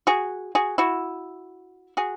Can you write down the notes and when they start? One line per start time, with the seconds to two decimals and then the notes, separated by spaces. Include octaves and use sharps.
0.07 F#4 G#4
0.55 F#4 G#4
0.78 E4 F#4
1.97 F#4 G#4